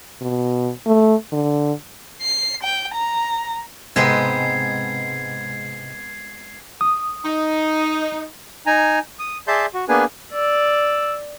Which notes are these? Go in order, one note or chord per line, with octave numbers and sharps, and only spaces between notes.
B2
A3
D3
C7
G5
A#5
G#2 C3 G#3 B3 C4 A#5 G#6 C7
D#6
D#4
D#4 G#5 A#5
D#6
G#4 D5 E5 A5 C6 G6
F#4
A#3 B3 D4 G#4 B4 G#5
D5 E6